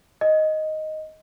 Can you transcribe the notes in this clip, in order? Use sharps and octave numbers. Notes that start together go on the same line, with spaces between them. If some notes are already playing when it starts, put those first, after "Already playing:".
D#5